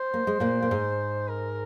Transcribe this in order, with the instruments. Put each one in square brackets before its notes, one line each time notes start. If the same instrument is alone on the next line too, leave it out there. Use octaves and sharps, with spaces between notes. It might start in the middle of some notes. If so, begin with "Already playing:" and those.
Already playing: [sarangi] C5
[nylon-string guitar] A#3
G#3
A#2 A#3
A#3
G#2 G#3
[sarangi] A#4